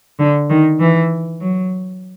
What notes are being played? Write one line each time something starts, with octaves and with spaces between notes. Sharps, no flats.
D3
D#3
E3
F#3